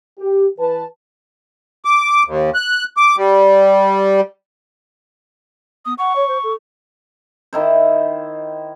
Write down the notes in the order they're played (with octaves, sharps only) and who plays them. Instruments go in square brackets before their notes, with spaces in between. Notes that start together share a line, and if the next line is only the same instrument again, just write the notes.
[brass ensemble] G4
E3 B4 A5
[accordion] D6
D#2
F#6
D6
G3
[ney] B3 [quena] D#6
[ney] F#5 [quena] C#6
[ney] C#5
C5
A4
[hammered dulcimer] D#3 E4 C5